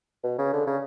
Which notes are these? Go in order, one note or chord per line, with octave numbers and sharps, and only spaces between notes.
B2
C#3
D3
C#3